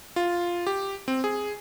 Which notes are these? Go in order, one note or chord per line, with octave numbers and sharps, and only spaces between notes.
F4
G4
C4
G#4